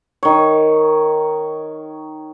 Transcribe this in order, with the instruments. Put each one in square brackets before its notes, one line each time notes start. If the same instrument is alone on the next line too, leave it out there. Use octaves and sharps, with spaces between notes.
[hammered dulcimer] D#3 C#5